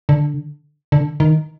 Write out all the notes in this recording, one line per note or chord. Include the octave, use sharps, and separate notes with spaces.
D3
D3
D#3